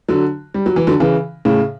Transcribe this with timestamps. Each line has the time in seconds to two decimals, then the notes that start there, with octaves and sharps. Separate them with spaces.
0.09 D3 F#3
0.54 G3
0.66 F#3
0.76 E3
0.87 D3 F#3
1.00 C#3 E3
1.45 A2 C#3